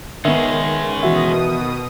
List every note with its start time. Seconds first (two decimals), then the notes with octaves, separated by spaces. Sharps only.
0.25 D#3 G#3 B3 C#4 E5
1.03 B2 E3 F#4 E5 D#6